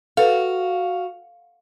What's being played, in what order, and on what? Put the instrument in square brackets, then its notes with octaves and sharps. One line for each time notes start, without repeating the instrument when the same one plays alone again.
[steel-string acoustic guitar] F#4 [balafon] A4 B4 [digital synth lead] F5